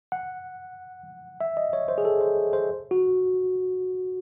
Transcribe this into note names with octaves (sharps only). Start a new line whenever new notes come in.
F#5
E5
D#5
C#5
C5
G#4
A4
C5
C5
F#4